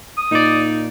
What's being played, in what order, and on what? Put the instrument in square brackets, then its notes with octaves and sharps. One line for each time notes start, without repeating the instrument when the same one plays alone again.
[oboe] D#6
[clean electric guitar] A#2 D5 [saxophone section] D#4